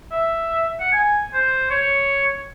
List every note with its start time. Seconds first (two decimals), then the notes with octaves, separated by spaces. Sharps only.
0.12 E5
0.80 F#5
0.92 G#5
1.34 C5
1.70 C#5